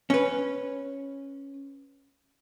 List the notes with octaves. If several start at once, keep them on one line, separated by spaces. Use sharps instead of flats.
C#4 B4